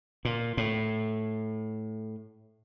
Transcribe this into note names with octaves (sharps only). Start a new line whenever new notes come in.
A#2
A2